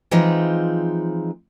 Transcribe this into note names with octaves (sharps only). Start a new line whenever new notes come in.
E3 F3 G#3 C4 D#4 F4